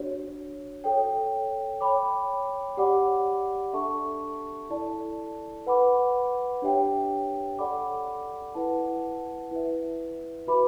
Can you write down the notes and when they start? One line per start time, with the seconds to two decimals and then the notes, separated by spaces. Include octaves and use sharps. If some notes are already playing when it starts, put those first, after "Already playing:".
Already playing: D4 F#4 C#5
0.84 A4 C#5 G5
1.81 C#5 G5 B5 D6
2.77 G4 D5 F#5 B5 D6
3.73 D4 A4 E5 A5 C#6
4.70 E4 A4 D5 A5
5.66 B4 F#5 B5 D6
6.62 D4 G4 C#5 E5 G5
7.59 A4 D5 F#5 B5 D6
8.55 E4 B4 F#5 A5
9.51 E4 B4 E5
10.47 F#4 B4 E5 B5 D6